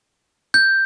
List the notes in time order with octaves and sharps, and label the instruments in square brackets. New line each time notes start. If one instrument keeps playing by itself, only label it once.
[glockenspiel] G6